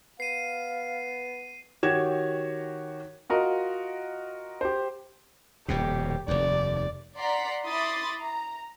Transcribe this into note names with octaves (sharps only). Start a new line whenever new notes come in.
B3 F5 C7 D#7
D#3 F#4 G4 C#5 G#6 E7
F4 F#4 A#4 D#5
G4 C5
D#1 F2 B2 G4
F1 D#2 D5
D5 F#5 A#5 C6 B6
E4 B5 C6 D6 D#6 A6
A#5